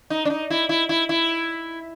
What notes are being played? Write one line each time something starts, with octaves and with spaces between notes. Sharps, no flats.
D#4
D4
D#4
E4
E4
E4
E4